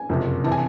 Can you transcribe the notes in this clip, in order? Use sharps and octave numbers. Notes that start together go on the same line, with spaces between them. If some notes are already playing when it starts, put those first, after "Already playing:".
Already playing: G#5
F#1 F2 C3
C3 E3 A5
G#5